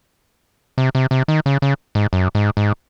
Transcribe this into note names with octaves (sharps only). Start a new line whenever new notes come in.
C3
C3
C3
D#3
C#3
C#3
G#2
F#2
G#2
G#2